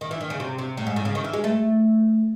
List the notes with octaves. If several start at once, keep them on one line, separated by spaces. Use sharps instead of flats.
D#3
E3
D#3
C#3
C3
C3
A2
G#2
A2
C#3
D#3
E3
G#3
A3